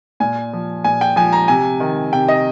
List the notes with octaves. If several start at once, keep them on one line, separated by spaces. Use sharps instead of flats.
A#2 G#5
F3
A#2 G#5
G5
F3 G#5
A#5
C3 G#5
D#3
C3 G5
D#5